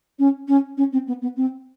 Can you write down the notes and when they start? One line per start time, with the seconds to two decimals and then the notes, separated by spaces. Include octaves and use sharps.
0.19 C#4
0.48 C#4
0.77 C#4
0.93 C4
1.07 B3
1.22 B3
1.37 C4